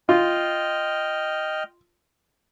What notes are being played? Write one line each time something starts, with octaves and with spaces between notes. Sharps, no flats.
F4 D#5 G5 F6